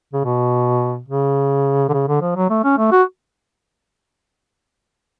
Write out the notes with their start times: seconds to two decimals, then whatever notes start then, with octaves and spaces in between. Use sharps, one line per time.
0.13 C#3
0.24 B2
1.08 C#3
1.89 D3
1.93 C#3
2.08 D3
2.21 F3
2.36 F#3
2.49 A3
2.64 C#4
2.78 A3
2.92 F#4